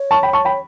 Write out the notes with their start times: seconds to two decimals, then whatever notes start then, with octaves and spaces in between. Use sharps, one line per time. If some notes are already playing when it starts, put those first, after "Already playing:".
Already playing: C#5
0.11 A5 C#6
0.23 G5 B5
0.33 A5 C#6
0.45 G5 B5